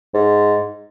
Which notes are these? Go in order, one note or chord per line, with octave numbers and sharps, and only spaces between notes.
G#2